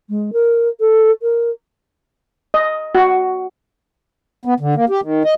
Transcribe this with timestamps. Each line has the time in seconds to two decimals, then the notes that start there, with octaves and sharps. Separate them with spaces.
0.09 G#3
0.33 A#4
0.80 A4
1.22 A#4
2.54 D#5
2.95 F#4
4.45 B3
4.60 D3
4.75 A#3
4.89 G4
5.02 D#3
5.25 D#5